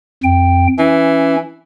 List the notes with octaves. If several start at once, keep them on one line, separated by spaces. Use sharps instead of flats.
F2 G5
E3 C#4